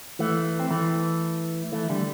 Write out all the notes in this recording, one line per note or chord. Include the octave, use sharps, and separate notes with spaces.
E3 A3
C4
E3 A3
E3 A3
D3 G3